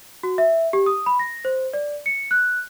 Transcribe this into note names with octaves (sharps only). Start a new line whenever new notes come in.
F#4
E5
G4
D#6
B5
A#6
C5
D5
C#7
F#6